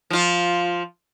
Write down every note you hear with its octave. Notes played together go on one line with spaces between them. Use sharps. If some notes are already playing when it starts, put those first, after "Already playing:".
F3 F4